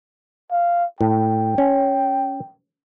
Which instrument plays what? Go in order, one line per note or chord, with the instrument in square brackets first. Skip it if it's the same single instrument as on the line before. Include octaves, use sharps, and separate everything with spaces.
[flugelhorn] F5
[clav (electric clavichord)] A2 [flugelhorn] G5
[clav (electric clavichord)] C#4